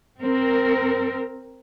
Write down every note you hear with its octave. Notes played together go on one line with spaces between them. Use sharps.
C4 A#4